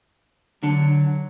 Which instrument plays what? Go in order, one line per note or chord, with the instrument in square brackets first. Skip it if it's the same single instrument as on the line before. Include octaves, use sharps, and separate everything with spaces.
[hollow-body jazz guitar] D3 [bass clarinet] F#3